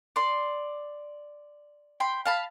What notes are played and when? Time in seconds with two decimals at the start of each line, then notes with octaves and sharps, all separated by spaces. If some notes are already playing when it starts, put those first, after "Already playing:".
0.16 D5 C6
2.00 G5 B5 C6
2.25 F5 A5 B5